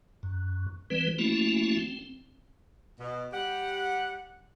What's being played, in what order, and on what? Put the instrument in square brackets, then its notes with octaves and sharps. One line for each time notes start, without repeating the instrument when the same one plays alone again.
[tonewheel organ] F#2
E3 G3 C4 B4
F3 A3 A#3 C#4 E4 F#4
C4
[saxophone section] B2
G3 G4 F#5